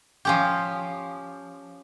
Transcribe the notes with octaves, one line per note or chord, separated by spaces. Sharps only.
F3 C#4 G4